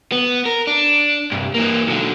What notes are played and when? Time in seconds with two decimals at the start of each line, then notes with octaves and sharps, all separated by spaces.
0.12 B3
0.46 A#4
0.67 D4
1.32 C2 G2
1.54 E3 A#3
1.87 B1 D3